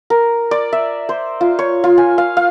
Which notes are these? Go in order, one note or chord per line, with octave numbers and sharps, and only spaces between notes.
A#4
D5
E5
C5
F4
C#5
F4
G#5
F5
F5